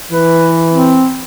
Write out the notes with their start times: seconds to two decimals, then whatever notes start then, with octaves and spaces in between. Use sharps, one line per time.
0.11 E3 B4
0.72 C4